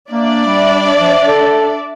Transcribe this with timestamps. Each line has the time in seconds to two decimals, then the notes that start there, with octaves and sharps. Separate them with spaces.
0.10 A#3 D4 D5 E5
0.46 G3
0.97 F3
1.27 A4